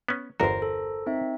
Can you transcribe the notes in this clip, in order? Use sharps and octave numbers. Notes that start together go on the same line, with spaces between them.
B3 C#4
G1 E2 F#4 A#4 C5
A4
C4 D#4 E5